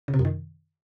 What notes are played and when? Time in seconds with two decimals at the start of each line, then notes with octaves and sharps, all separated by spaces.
0.08 C#3
0.14 C3
0.19 F#2
0.25 D#3